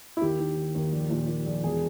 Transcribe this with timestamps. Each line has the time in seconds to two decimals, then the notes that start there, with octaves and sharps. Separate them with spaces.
0.17 E4
0.21 D#2 G4
0.39 D#3
0.56 D#3
0.75 D#2
0.92 A#1
1.10 A#2
1.27 A#2
1.46 A#1
1.63 E1 G#4